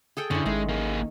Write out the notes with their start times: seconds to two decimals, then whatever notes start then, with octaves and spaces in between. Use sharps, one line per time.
0.17 G#4 A4 G5
0.31 F#2 D3 C#4 E4
0.46 G#1 D#3 G#3
0.69 A#3 G#4